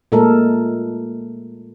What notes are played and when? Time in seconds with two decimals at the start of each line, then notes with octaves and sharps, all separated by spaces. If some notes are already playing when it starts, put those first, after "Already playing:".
0.12 A#2 G#3 A3 A4 A#4